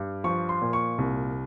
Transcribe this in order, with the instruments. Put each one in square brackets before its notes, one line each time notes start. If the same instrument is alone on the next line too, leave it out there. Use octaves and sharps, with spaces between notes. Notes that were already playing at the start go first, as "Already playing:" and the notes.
Already playing: [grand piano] G2
F3 C#6
C6
A#2
C#6
C2